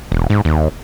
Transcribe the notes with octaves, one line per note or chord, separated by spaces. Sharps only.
E1
G#2
D#2